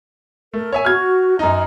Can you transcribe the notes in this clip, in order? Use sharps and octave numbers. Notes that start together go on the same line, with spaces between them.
A3 A#4
C#5 E5 G#5
F#4 F6 G#6
F#2 D#4 A#5